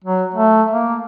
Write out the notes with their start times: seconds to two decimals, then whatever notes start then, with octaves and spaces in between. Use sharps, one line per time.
0.04 F#3
0.34 A3
0.71 A#3